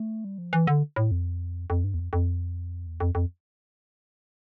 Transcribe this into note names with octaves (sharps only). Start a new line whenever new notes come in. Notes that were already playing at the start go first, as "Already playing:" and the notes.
Already playing: A3
G3
F3
E3
D3
A2
F2
F2
G2
E2
F2
F2
E2
F2
F2